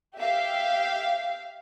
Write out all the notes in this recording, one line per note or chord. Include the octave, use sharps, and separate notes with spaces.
G4 E5 F5